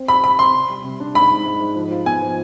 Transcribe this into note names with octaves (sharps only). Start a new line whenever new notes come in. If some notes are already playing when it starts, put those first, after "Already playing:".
Already playing: C4
G4 B5
G4 B5
C4 C6
C3
G3
C3
D4
G#2 B5
G#2
G#2
G#2
F3
F4
B3 G#5
F3